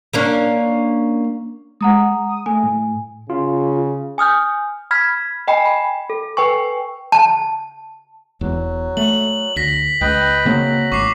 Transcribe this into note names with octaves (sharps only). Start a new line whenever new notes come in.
A#3 C#4 D4
G#3 F#5 A#5 D#6
D#6
A3 G#5
A2
C#3 F4
G#5 D#6 F6 G6
B5 F6 G#6 B6
D#5 G5 G#5 B5
B5
A4
B4 G5 G#5 C#6
A5
E1 E2 F#3
A3 F#7
D2 A#6 B6 F#7
C#2 B4 D#5 G5
C#3 F#3 A#3 C4
G#1 C#6 D6 C7